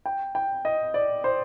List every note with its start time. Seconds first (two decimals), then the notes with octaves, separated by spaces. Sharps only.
0.05 G5
0.35 G5
0.65 D#5
0.94 D5
1.24 C5